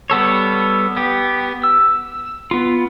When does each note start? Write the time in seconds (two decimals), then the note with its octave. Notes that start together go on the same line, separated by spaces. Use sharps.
0.10 G3 B3 A4 C#5
0.97 B3 G4
1.63 E6
2.51 B3 F4